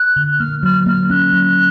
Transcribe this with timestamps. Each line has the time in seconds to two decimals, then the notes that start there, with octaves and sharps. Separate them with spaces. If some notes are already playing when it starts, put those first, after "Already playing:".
Already playing: F#6
0.16 D3
0.39 A#3 F6
0.63 F#3 F6
0.86 A#3 F6
1.10 C#4 F#6
1.33 F#3